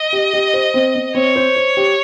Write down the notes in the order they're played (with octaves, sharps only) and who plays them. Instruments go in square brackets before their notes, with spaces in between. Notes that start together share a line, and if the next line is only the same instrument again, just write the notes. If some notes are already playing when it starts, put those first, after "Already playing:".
Already playing: [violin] D#5
[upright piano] G4
G4
C5
C4
C4
[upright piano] C4 [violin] C#5
[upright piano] C5
C5
G4